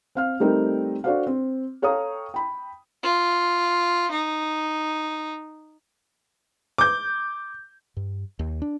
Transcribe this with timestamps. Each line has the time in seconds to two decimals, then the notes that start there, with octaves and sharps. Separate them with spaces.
0.15 C4 F5 F6
0.40 G3 A3 C4 D#4 A#4 G5
1.04 D4 F#4 A4 C5 D5 F5
1.27 C4
1.82 A4 C#5 F5 G5 A#5 D#6
2.34 G5 B5
3.03 F4
4.11 D#4
6.78 D6 G6
7.97 G2
8.39 D#2
8.62 D4